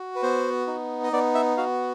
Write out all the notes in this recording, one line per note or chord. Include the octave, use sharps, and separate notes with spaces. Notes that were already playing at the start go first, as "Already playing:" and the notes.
Already playing: F#4
B4
B3 C5
D#4
D#5
B3 D5
E5
F#4 F5